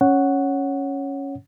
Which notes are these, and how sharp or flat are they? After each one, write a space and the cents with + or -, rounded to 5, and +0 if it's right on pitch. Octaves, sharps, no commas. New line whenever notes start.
C#4 +0 C#5 +0 F#5 +0